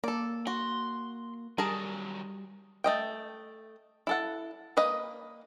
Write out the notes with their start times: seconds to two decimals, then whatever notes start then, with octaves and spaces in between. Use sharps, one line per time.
0.04 A#3 A4 D5
0.47 F#4 C6
1.58 D#3 F#3 G3 G#4 A#4 A5
2.84 A3 D#5 G5
4.07 E4 A4 F#5
4.77 A#3 B4 D#5